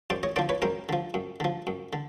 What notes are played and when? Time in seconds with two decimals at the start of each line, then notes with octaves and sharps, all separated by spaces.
0.10 F#2 C5 D5
0.23 C#5 D#5
0.36 D3 F3 C5 D5
0.49 B4 C#5
0.62 F#2 A#4 C5
0.89 D3 F3
1.14 F#2
1.40 D3 F3
1.67 F#2
1.93 D3